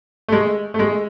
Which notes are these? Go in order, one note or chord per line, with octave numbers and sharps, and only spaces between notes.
A3
G#3
A3
G#3